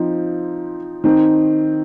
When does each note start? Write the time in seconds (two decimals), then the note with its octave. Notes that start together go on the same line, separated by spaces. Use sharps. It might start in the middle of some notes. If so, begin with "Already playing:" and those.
Already playing: F3 C4 D#4
1.04 D#3 C4 D#4